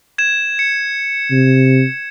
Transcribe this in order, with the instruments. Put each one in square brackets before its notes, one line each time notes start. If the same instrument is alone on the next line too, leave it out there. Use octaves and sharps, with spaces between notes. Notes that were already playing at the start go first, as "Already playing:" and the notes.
[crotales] G#6 E7
C#7
[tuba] C3